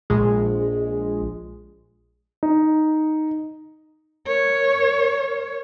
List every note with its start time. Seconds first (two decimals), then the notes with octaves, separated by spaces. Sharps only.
0.10 A#1 G#3
2.43 D#4
4.27 A#4 C#5